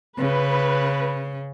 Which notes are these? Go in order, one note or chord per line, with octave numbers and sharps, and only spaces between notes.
C#3 B4